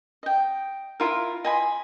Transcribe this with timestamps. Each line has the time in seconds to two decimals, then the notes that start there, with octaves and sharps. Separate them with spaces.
0.23 D#5 G5
1.00 E4 F4 A#4
1.44 D#5 G#5 B5 C6